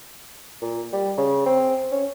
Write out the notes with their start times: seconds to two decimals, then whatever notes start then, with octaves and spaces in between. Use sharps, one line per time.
0.62 A#2
0.93 G3
1.17 C#3
1.46 C4
1.92 C#4